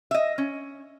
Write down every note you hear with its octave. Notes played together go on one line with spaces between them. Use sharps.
D#5 E5
C#4